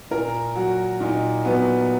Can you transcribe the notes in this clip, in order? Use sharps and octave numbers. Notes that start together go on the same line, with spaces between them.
A#2 A#4
F#3 F#4
A#2 D#4
F#3 B3